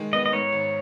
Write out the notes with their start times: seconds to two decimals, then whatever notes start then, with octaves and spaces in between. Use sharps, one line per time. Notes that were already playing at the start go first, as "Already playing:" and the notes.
Already playing: D#3 G#3
0.13 B3 D#5
0.26 D#5
0.32 G#2 C#5
0.53 G#1